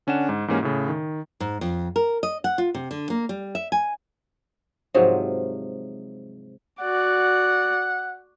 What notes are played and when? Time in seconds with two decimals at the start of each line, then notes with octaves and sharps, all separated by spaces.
0.07 D3 C#4 D4 F#5 E7
0.29 G#2
0.48 G#2 E3 A#3 C#4 G4
0.63 A2 C#3
0.88 D#3
1.40 G#2
1.61 F2
1.96 A#4
2.23 D#5
2.44 F#5
2.58 F4
2.74 C3
2.91 D3
3.10 A#3
3.29 G3
3.55 E5
3.72 G#5
4.94 G#2 C3 F3 F#3
6.81 F#4 D5 F#5